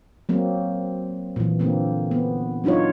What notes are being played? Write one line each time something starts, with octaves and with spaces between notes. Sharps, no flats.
F#3 A#3 C4
A#2 E3
D3 A#3 C4
B3
F#3 D4 D#4 F4 C#5